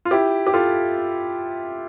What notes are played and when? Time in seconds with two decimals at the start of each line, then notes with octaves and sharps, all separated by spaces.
0.05 F4
0.11 E4 G4
0.47 G4
0.53 F4 A4